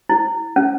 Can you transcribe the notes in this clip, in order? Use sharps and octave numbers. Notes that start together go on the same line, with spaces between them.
E4
C#4